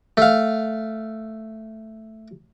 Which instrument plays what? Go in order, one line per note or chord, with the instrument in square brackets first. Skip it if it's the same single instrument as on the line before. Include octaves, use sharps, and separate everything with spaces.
[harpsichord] A3 F5